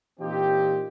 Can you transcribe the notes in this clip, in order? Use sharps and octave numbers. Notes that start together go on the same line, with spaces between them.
A#2 E3 C4 D#4 F4 G4